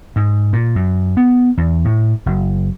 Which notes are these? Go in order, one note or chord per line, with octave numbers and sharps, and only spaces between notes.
G#2
A#2
F#2
B3
E2
A2
F#1